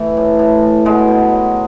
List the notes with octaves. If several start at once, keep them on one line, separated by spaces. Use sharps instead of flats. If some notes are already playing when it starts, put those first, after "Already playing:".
Already playing: E3 A3
A2
A2
A2
B2 G#3
B2
F#3